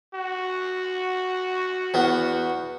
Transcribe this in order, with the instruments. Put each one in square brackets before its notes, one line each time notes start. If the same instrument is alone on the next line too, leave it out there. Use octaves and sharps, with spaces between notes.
[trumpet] F#4
[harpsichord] E2 B3